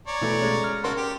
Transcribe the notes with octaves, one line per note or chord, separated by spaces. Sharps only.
C#5 D5 A#5
B2 E3 A3 A4
C#3 G#3 C#4
F6
C#3 F#4 A4 A#4 C6
G4